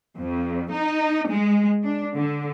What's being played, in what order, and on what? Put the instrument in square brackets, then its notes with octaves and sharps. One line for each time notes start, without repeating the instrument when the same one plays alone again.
[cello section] F2
D#4
G#3
D4
D3